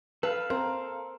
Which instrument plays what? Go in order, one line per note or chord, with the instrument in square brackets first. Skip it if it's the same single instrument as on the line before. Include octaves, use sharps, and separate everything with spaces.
[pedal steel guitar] A4 F5 [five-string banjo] B4
[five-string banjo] C4 [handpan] A#4